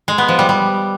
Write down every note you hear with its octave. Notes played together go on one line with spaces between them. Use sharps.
G#3
B3
F3
G3
G3